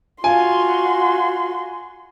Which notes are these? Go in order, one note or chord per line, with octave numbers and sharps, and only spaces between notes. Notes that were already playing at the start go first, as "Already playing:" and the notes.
F4 F#4 G#5 C6